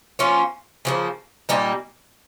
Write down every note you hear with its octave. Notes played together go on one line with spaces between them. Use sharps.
F3 A#3 C#4 F4
C#3 F3 A#3
A#2 G3 A#3 D#4